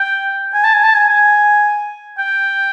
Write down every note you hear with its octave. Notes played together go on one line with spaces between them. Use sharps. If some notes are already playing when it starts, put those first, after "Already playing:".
Already playing: G5
G#5
A5
G#5
A5
G#5
G#5
G5